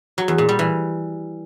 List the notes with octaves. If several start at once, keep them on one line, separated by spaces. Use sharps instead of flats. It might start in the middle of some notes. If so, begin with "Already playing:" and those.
F#3
E2
A#2
G3
E3